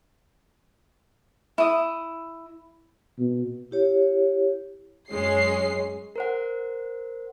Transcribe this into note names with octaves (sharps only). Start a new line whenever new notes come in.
E4 D#6
B2
E4 G4 C#5
F#2 G#3 C#4 C7
A#4 C5 F#5